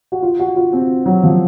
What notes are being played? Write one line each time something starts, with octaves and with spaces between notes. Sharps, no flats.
F#4
F4
F#4
F4
C4
F#3
F3